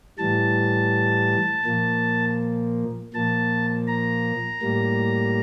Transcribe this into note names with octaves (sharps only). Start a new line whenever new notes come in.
A2 E3 G3 A5
A#2 F3 A#3
A#2 F3 A#3 A5
A#5
A2 G3 A#3